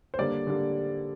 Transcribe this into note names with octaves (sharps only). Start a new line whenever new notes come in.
C5
D3 G3 A#3 D5
D3 G3 A#3